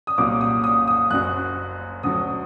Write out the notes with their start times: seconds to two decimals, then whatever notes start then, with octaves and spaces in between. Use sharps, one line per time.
0.07 D#6
0.18 C2 A#2 F#3 D6
0.41 D#6
0.64 D#6
0.87 D#6
1.10 F#1 F#2 F#3 F#6
2.03 D2 D3 F#3 D#6